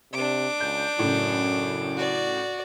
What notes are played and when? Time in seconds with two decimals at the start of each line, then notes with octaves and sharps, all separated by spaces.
0.14 C3 D4 D6
0.60 C#2 G6
0.99 F#2 A2 C#3
1.97 F#4 D5